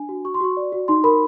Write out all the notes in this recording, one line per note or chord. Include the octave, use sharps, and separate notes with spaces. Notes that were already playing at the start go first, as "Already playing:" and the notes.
Already playing: D4 G#5
F#4
F#4 C#6
C6
F#4 C#6
D5
F#4
D#4 C6
A#4 B5